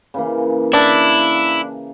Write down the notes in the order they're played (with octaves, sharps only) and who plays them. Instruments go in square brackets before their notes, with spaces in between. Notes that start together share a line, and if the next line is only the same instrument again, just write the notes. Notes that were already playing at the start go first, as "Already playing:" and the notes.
[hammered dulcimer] C#3 E3 A#3
[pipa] D4 [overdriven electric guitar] E4